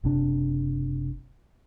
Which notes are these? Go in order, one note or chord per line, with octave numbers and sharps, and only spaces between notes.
F#1 C3 D4